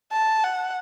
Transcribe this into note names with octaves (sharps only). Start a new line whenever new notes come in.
A5
F#5